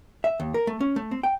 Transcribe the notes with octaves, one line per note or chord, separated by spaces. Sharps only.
E5
D#2
A#4
A3
C#4
A3
C4
G5